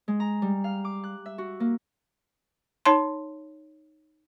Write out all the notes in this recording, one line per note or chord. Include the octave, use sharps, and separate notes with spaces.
G#3
A#5
G3
F5
D6
F#6
E5
F#4
A#3
D#4 C#5 A5 C6